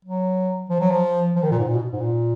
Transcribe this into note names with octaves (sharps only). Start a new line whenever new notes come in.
F#3
F3
F#3
F3
F3
D#3
A#2
G#2
A#2
B2
G#2
A#2